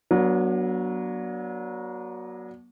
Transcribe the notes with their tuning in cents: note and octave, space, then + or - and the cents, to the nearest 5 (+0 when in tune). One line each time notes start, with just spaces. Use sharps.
F#3 +0 B3 -45 D4 -10